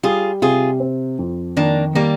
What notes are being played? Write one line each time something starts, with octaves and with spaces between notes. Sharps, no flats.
G3 F4 G#4
C3 F4 G#4
C4
F2
D#3 A#3 D4
D#3 G3 A#3